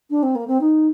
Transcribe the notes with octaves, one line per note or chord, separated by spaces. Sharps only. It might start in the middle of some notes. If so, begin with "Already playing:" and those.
D4
C4
A#3
C4
D#4